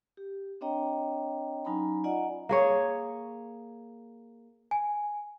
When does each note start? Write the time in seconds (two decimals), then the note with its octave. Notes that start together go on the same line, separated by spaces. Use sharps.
0.17 G4
0.61 C4 D4 C#5 D#5 G5 A#5
1.65 F#3 C#4 D#4 G#5 A#5 B5
2.04 F4 D5 D#5 F#5 G#5 A#5
2.49 A#3 G#4 C#5
4.71 G#5